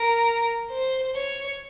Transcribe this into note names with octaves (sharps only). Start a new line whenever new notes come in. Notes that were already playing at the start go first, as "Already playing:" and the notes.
Already playing: A#4
C5
C#5